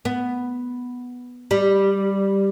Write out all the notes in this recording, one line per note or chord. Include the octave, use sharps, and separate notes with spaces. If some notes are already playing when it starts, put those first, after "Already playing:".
B3
G3